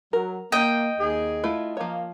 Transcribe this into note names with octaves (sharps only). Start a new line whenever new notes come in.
F#3 A#4
A#3 D#5 G5
D#2 G#4
A3 E4 F4
F3 A#3 C#5